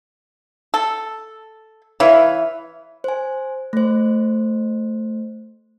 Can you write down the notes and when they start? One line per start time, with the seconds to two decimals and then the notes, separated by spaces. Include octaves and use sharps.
0.74 A4
2.00 E3 C#5 E5 F5
3.04 C5 G#5
3.73 A3 C5